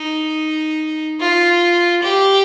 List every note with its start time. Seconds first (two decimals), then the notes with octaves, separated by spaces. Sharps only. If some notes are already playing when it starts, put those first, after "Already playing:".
Already playing: D#4
1.20 F4
2.02 G4